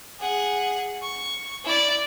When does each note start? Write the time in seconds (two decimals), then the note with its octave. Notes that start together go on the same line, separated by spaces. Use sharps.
0.20 G#4 F#5
1.02 C#6
1.65 E4 D5